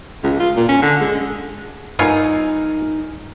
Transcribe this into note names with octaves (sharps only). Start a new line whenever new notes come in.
C#2
F4
A#2
C#4
D3
G#3
G2 B3 D#4 F4 A#4 C#5 G#5 E6